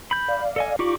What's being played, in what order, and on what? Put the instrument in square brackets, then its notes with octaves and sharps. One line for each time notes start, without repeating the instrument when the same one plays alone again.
[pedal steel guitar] B5 G6
[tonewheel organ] D5 F5
[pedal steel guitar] A4 D#5 G#5
[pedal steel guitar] D#4 G4 D5 [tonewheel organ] F4 C#6 D6